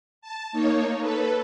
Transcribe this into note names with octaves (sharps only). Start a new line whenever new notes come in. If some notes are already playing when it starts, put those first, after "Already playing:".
A5
A#3 D#4 C#5
A4 B4